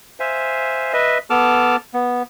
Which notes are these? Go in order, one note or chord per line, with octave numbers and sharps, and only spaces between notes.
C5 E5 F5 G#5
B4 D#5 E5
B3 A4 A5 D6 F6
B3